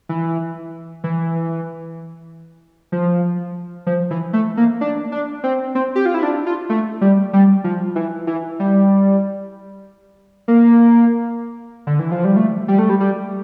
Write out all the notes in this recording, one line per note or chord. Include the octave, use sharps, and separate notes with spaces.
E3
E3
F3
F3
E3
A3
A#3
D4
D4
C4
C4
G4
F4
E4
D4
F4
A3
G3
G3
F3
E3
E3
G3
A#3
D3
E3
F3
G3
A3
G3
A3
G3
G3